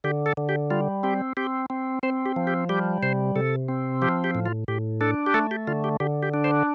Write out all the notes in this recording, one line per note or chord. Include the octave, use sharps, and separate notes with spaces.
D3 G4
A4
D3
G4
G3 F4
C4 G4
C4 G4
C4
C4 C5
G4
F3
G4
G3 G4
C3 C5
C3 A4
C4
F3 G4
G4
A2
F4
A2 G4
D4 A4
G4
A3 A4
G4
D3 F4
G4
D3 G4
G4
D4
C5